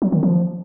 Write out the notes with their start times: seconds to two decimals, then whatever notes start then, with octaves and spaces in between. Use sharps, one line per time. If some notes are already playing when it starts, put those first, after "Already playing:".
0.02 F#3
0.12 D#3
0.23 F3